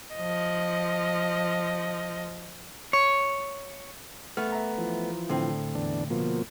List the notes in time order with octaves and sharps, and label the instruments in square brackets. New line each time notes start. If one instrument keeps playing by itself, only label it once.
[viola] F3 D#5
[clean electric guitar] C#5
[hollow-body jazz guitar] A3 B3 [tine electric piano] F6
[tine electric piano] E5 A#5
[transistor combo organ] E3 F3
[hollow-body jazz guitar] A2 C4 [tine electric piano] D3
[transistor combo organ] E2 D4
B2 F3 A#3